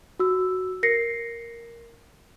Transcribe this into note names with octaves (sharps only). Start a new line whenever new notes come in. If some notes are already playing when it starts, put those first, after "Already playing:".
F#4 E6
A#4 A#6 C7 C#7